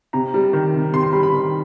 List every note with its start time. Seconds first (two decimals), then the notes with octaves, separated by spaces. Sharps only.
0.13 C3 A#5
0.34 G3
0.53 D#3
0.74 C3
0.93 C3 C6
1.03 C6
1.13 G3 B5
1.23 B5
1.33 D#3